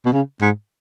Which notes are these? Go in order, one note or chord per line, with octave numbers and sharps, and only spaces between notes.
B2
C#3
G#2